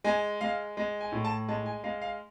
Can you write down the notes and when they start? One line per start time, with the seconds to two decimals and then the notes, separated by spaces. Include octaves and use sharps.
0.04 G#3 G#5
0.41 G#3 F5
0.77 G#3
1.01 G#5
1.12 A2
1.25 A5
1.48 G#3 A5
1.66 G#5
1.84 G#3 F5
2.02 F5